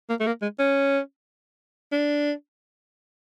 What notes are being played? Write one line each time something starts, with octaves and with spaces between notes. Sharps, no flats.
A#3
A3
A#3
G#3
C#4
D4